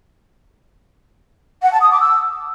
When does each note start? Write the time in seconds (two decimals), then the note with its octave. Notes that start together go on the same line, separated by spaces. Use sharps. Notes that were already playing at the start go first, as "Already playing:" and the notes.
1.62 F#5
1.72 A5
1.81 D#6
1.91 D6
2.01 E6